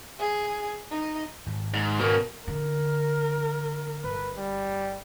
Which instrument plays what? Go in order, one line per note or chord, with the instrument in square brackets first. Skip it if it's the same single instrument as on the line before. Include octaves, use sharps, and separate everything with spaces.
[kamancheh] G#4
D#4
[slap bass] G#1
[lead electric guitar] G#2
[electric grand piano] B2 [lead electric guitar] A#3 C#4 [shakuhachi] A#4
[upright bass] D3 [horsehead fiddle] A#4
[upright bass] G1 [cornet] B4
[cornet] G3